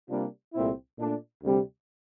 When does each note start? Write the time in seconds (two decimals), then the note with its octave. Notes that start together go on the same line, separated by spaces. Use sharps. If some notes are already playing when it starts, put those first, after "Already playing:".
0.09 C3 G3 A#3 D4 F4
0.54 C2 A#2 A3 C4 E4
0.98 A#2 A3 D4
1.42 D2 C3 G3 C4 G4